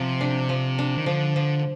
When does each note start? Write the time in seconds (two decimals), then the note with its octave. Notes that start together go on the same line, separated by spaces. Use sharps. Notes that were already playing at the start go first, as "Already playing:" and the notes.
Already playing: C3 F3
0.21 D4
0.49 F3
0.79 D4
0.98 D#3
1.06 D3 F3
1.36 F3